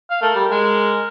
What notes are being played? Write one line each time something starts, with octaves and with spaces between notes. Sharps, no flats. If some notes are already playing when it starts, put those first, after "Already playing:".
F5
A3 A#4
G3
G#3